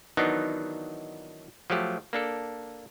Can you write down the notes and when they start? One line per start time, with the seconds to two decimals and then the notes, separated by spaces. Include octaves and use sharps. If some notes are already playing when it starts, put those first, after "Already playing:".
0.17 D#3 E3 F#3 B3 D4 D#4
1.70 F3 F#3 A3 G4
2.13 A#3 D4 A4